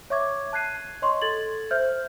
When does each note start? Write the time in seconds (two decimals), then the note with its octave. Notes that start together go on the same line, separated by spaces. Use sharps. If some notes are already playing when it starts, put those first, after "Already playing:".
0.10 C#5 E5 C#6 D6 G#6
0.53 A5 F#6 G#6 C7 D#7
1.02 C#5 D#5 C6 C#6
1.22 A4 G#6 A6 F#7
1.71 C5 E5 F6 G6